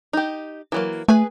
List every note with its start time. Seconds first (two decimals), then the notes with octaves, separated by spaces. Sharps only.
0.13 D#4 G4
0.72 E3 F#3 A#3
1.08 A3 G#4 B4 G#5